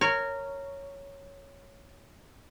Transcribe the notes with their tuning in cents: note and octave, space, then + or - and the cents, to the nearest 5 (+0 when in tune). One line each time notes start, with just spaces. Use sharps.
A#4 -15 C#5 +0